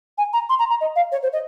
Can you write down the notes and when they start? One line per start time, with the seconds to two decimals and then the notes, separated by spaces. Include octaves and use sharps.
0.18 G#5
0.33 A#5
0.49 C6
0.59 A#5
0.70 A#5
0.81 D#5
0.96 F5
1.12 C#5
1.23 C5
1.33 D#5